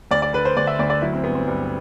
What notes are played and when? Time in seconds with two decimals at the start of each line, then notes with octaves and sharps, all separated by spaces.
0.11 D2 D5
0.22 D5
0.33 D3 B4
0.45 C5
0.56 D2 D5
0.67 E5
0.79 D2 D5
0.90 D5
1.02 F#3 E4
1.13 C4
1.24 G2 B3
1.35 C4
1.48 G2